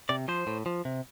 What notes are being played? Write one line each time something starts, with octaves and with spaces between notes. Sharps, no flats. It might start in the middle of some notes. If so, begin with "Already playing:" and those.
C3 D5
F3 C5
A2
F3
C3